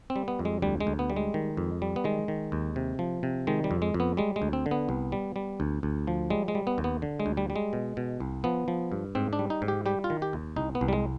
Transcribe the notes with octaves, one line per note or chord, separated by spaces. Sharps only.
C4
G3
B3
F2
G#3
D2 G3
G#3
D2
B3
G3
G#3
D#3
F2
G3
B3
D#3 G#3
D#3
D#2
C3
F3
C3
D#3 G#3
G3
F2
G#3
F2
B3
G3 G#3
G#3
D2
C4
D3
B3
C2
G3
G3
D2
D2
F3
G3 G#3
G#3
G3
B3
D#2
B3
D3
G#3
D2
G3
G3
G#3
B2
B2
C2
F3 B3
F3
G2
G#2 C4
D4
G3
D#4
G#2
G4
G3 G4
F4
D#3
G4
D#2
C2 D#4
B3
C2
G3
G#3